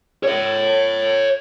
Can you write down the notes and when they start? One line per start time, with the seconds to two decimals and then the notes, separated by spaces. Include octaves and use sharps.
0.23 C#5 E5